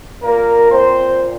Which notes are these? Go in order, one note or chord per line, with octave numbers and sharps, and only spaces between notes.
A#2 A#3 A#4
C4 C5